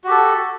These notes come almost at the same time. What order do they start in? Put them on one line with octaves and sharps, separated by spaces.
F#4 G4 A4